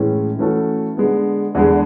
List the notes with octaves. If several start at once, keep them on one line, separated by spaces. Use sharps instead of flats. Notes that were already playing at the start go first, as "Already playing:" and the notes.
Already playing: A2 E3 G#3 C#4
E3 A3 C#4 F#4 A4
D3 G#3 B3
E2 D3 G#3